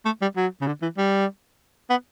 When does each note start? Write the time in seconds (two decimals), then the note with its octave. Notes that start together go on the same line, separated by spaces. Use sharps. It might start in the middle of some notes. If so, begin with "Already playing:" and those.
0.05 A3
0.22 G3
0.37 F#3
0.61 C#3
0.67 D3
0.82 E3
0.98 G3
1.90 B3